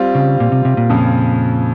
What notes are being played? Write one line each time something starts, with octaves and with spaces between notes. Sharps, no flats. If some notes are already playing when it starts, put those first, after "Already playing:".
Already playing: G3 C4 F4
C#3
A#2
C3
C3
A#2
F2 C#3 F3